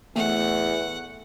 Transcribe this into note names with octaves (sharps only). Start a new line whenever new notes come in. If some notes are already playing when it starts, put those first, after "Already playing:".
E2 A3 F#5